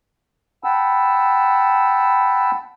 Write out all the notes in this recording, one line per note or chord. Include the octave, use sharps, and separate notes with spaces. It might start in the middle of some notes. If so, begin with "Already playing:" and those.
F#5 G5 A5 B5 E6